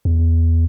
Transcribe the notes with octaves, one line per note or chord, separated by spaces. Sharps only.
E2